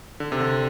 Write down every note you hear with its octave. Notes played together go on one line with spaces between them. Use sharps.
D3
C3
D3